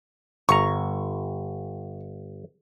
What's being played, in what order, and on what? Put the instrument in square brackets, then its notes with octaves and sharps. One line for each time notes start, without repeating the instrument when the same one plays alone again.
[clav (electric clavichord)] G1 A#5 [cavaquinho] C#6